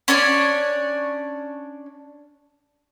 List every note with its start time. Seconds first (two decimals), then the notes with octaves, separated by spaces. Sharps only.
0.08 C#4 D4 C#5 D5